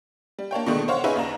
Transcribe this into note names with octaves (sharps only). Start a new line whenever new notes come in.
G3
A#3 D4 C#5 G5
B2 D3 D#3 G#3 A3
C5 C#5 F5 F#5
C#4 D#4 G#4 B4 E5 G#5
D#2 C#3 D4 A#5